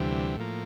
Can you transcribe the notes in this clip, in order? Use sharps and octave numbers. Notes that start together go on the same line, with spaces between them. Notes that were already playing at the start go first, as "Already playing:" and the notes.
Already playing: D2 C3 E3 G3
A2 F3 A#3